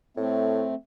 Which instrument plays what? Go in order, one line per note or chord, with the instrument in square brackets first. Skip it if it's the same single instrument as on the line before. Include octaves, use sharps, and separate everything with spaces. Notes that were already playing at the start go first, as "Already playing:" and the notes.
[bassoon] A2 [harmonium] A3 C4